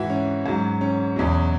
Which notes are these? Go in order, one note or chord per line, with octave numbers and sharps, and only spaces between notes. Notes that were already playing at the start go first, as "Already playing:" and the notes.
Already playing: G#2 E3 E4 F#4
C#4
G#2 F#3
C#4
E2 B2 F#3